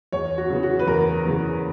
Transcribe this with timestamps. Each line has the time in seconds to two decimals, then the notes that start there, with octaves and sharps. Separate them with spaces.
0.12 E2 C#5
0.38 F#4
0.50 C#3 E3 B3
0.63 F#4
0.79 B4
0.87 E2 A#4
1.25 C#3 E3 B3